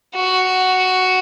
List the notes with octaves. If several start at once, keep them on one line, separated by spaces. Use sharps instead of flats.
F#4